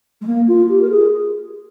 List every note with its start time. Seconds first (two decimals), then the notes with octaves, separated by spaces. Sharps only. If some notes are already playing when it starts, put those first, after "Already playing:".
0.21 G#3
0.27 A#3
0.47 F4
0.69 G4
0.81 A#4
0.90 G#4